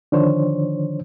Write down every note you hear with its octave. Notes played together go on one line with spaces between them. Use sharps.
D3 D#3 F3 D4 C5 C#5